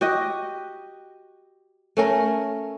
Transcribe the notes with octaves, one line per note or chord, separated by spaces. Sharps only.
F#4 G4 D#5
A3 C#4 A#4